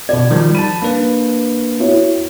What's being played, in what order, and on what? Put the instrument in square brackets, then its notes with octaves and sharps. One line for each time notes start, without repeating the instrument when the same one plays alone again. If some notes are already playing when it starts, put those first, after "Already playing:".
[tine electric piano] B2 G#6 [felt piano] D5
[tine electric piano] D#3 F3 G3
[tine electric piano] A5 B5 [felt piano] D#7
[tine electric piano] A#3 D4 B4
[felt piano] E4 F#4 C#5